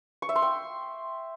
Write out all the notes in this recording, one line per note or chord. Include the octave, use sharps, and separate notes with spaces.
C#6
E5
C6
G5